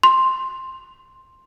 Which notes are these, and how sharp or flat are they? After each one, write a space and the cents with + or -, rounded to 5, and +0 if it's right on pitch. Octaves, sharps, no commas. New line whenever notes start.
C6 +10